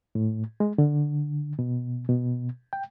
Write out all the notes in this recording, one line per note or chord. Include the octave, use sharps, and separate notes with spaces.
A2
G#3
D3
B2
B2
G5